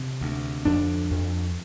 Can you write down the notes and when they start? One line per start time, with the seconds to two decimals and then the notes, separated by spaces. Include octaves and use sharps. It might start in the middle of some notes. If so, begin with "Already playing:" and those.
Already playing: C3
0.21 D2
0.65 F2 D4
1.11 F2